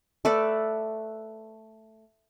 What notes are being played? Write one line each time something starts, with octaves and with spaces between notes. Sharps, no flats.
A3 A4 B4 D5